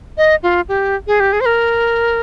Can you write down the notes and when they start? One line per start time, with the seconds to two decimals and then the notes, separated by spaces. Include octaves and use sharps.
0.17 D#5
0.43 F4
0.69 G4
1.07 G#4
1.20 G4
1.33 G#4
1.41 C5
1.46 A#4